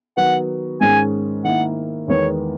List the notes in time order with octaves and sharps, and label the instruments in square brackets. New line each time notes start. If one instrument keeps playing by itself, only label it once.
[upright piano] D#3 F#3 B3 F#4 [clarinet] F#5
[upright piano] G#2 D#3 G#3 C#4 G#4 [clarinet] G#5
[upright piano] D#3 A#3 E4 [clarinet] F#5
[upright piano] E2 D#3 G#3 B3 [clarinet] C#5